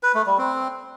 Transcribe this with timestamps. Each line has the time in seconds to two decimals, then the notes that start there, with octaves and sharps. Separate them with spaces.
0.03 B4
0.15 A3
0.26 G3
0.38 C4